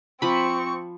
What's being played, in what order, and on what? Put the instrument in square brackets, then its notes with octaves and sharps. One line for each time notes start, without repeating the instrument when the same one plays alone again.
[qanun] F3 B5 [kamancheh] C4 C#6